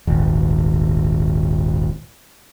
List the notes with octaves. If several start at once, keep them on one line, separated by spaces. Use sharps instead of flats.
D#1 G#1